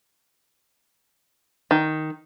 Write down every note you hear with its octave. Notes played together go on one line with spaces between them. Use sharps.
D#3